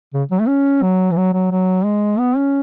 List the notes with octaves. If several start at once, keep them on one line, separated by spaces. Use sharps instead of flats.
C#3
F#3
A3
C#4
F#3
E3
F#3
F#3
F#3
G#3
B3
C#4